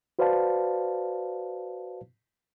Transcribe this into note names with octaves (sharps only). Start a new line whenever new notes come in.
F#4 B4 C5 D5 F5 A5